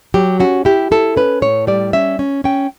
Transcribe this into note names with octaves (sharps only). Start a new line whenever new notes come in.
F#3 G4
C#4 F#4
E4 G4
E4 A4
C#4 B4
A2 C#5
G3 D5
C#4 E5
C#4
C#4 G5